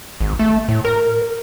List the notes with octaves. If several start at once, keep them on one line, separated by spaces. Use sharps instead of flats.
G#1
A3
A2
A#4